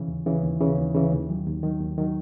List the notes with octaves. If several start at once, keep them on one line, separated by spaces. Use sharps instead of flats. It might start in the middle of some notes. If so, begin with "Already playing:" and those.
Already playing: C#3 E3
D#2
C#3 E3
D#2
C#3 E3
D#2
C#3 E3
D#2
D#3 F#3
D#2
D#3 F#3
D#2
D#3 F#3